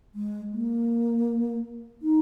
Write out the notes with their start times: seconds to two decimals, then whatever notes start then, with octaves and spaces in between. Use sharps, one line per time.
0.15 G#3
0.53 A#3
2.02 D#4